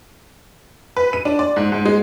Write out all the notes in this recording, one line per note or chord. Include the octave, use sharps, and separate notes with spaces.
B4
D#7
D4
D5
G#2
G#2
G#3